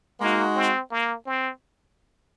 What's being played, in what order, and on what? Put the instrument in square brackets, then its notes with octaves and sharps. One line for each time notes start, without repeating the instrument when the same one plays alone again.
[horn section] G#3 D#4 F#4 [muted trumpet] A#3
[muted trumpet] C4
A#3
C4